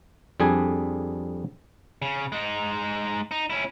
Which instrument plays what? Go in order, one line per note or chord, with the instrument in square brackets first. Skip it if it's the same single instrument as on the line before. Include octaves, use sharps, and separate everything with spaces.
[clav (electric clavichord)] F2 G3 D4 G#4 G#5
[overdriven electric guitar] C#3
G#3 D#4
D#4
C#4 E4